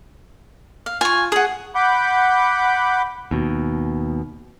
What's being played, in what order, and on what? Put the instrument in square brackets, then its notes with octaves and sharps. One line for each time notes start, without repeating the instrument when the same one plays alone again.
[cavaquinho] F5
[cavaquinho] F4 C#6 [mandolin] G#5
[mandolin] G#4 [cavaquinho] F#5 D#6
[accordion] F#5 B5 D6 G6
[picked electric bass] D#2 B2